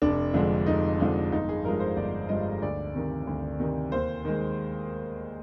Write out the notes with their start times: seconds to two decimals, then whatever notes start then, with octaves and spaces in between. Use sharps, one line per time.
0.02 F1 D4
0.34 F2 D3 F3 G#3
0.66 F1 D#4
0.99 F2 D3 F3 G#3
1.32 G1 D#4
1.49 G#4
1.64 G2 F3 G#3 A#4
1.80 C5
1.96 G1 D5
2.29 G2 F3 G#3 D#5
2.62 D2 D5
2.94 C3 D#3
3.27 D2
3.59 C3 D#3
3.91 D#2 C5
4.25 D#3 G#3